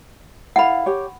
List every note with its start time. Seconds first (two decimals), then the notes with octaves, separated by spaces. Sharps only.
0.56 E4 A4 F5 F#5 B5
0.86 G4 C#5